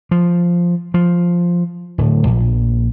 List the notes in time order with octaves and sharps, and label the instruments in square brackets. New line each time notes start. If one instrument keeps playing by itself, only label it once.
[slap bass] F3
F3
D1
A#1